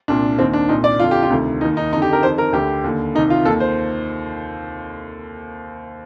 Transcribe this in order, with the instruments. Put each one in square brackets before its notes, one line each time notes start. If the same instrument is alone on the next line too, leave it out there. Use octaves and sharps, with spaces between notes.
[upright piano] C2 A#2 D4
D#2 D#3 C4
D4
C2 A#2 D#4
D5
F2 D3 F4
G4
F4
D2 C3 D#3
D#2 D#3 D#4
D#4
F2 D#4
D3
G4
A#4
F2 C5
D#3
A#4
D2 D3 G4
D#2 D3
C2 C3 D#3 D#4
F4
D#2 D#3 A4
C5